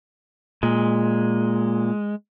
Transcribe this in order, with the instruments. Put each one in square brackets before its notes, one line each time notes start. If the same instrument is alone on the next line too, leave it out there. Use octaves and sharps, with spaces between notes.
[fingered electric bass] A#2 [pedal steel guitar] G#3